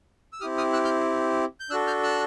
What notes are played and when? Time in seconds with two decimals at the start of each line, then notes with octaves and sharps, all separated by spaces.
0.33 E6
0.41 C4 E4 G4 D#6 F6
0.57 D#6 F6
0.73 E6 F#6
0.84 F6 G6
1.60 G6
1.70 D4 F#4 A4 E6 F#6
1.87 F6 G6
2.03 E6 F#6